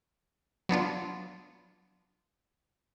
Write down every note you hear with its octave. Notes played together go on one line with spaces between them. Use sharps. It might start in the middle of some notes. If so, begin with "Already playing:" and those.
F#3 B3 D4 F4